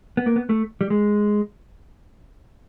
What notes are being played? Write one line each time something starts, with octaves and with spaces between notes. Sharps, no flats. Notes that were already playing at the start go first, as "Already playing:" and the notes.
B3
A#3
B3
A3
G3
G#3